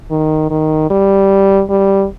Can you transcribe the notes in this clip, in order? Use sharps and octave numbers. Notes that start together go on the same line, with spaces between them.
D#3
D#3
G3
G3